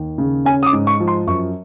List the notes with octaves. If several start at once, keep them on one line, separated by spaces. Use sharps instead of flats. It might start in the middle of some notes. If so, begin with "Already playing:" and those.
Already playing: D#2
C#3
C#4 G#5
D#6
D6
G#2
C#6
F3
C6
F#2 C#6